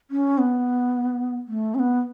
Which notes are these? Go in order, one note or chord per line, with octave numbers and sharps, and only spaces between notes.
C#4
B3
A3
C#4
B3